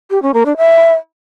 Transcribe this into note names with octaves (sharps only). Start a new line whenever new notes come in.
G4
C#4
A#3
D4
E5